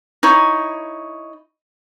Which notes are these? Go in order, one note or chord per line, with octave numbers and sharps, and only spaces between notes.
D#4 E4 C#5